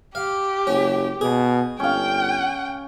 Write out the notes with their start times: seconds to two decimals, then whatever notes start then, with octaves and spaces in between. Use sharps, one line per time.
0.15 G4 F5
0.67 F#1 C#4
1.21 B2 G#4
1.80 G1 C#4 F5 G5